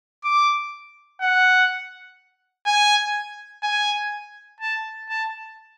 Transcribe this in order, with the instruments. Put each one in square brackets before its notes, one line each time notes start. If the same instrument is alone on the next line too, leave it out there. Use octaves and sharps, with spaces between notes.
[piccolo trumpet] D6
F#5
G#5
G#5
A5
A5